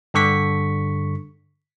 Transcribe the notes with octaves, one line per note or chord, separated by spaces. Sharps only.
G2 D3 C#6 B6